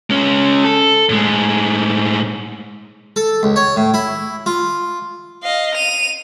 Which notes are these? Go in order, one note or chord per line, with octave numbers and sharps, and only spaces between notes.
G#3 C#4
A4
A2 G#3
A4
C#2
C#5
A2
E4
F4
D#5 F5
D#7 F7